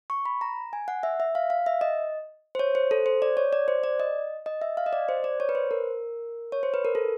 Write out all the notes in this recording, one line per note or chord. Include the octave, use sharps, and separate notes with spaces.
C#6
B5
A#5
G#5
F#5
E5
E5
F5
F5
E5
D#5
C5
C#5
C5
A4
C5
D5
C#5
D5
C5
D5
D#5
D#5
E5
F5
D#5
D5
C5
D5
C#5
B4
C5
A#4
C#5
C5
B4
A#4
A4